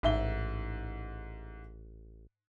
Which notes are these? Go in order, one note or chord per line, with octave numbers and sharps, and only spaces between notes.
A1 G#2 E5 G7